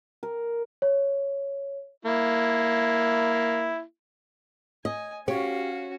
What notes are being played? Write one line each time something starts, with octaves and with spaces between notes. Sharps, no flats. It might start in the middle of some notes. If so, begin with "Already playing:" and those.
A#4
C#5
A#3 E4
D#5 G#5
C#4 F#4 G4 C#5 F5